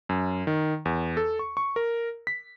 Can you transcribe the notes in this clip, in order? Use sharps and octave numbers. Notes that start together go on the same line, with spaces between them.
F#2
D#3
E2
A4
C#6
C#6
A#4
B6